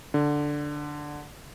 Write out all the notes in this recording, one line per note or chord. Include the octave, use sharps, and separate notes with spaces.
D3